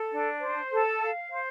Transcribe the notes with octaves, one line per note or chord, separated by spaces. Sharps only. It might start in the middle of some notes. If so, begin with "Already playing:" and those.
Already playing: A4
D4
C5
A4
F5
C5